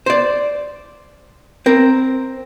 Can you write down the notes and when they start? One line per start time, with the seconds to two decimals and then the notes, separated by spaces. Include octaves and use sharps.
0.06 C5 D5
1.66 C4 A#4